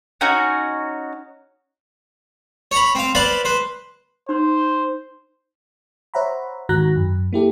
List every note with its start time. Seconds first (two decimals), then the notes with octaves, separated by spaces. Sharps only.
0.21 C#4 D#4 F#4 G#5
2.71 C#5 A#5 B5
2.95 C4 F5
3.15 B4 C5 D5 F5 A5 B5
3.45 B4 C5
4.29 D#4 C5 C6
6.14 C5 C#5 E5 F#5 A#5 B5
6.69 G#2 D#3 F#4 A#5 F#6 A#6
6.96 F#2
7.33 A#3 E4 G4 A4